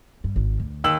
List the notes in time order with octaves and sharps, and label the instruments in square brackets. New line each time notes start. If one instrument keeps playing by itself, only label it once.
[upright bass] G2
G#1
D2
[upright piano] D#2 E6 F#7